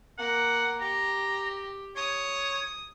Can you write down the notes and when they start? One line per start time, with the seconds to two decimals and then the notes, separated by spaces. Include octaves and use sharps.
0.18 A#3 A#4 F#5
0.81 G4 A#5
1.96 C#5 D#6